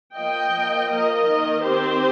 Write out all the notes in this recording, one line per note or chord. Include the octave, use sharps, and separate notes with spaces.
F3 A#3 D#5 G5
F3 A#3
F3 A#3 A#4 D#5
D#3 A#3
D#3 C4 G4 C5